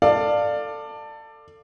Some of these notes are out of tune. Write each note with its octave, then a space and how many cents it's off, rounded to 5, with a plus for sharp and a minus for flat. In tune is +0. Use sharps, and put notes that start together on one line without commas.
A4 +20 D5 +15 F5 +0